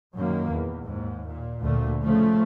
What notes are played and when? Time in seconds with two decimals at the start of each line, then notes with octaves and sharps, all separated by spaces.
0.15 F#2 A#2 D#3 A#3
0.51 E2
0.84 D#2 G#2
1.27 A#2
1.62 D2 A#2 D3 A3
2.01 C#3 F3 A3